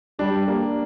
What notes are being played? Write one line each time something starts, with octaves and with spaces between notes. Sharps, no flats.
G3 D4
A#3